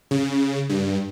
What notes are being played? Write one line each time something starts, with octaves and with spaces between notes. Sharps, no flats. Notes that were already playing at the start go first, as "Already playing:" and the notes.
C#3
G2